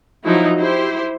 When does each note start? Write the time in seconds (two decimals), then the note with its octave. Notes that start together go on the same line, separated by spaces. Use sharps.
0.24 F3 F#3 D#4 E4 F#4
0.58 E4 G4 C5